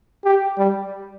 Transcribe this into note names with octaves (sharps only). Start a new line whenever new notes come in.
G4
G3